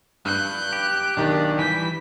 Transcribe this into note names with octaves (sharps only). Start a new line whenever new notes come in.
G2 F#6 G6
G4
B1 D#3 D4 D#4 G4
E3 G3 G#5 G6 B6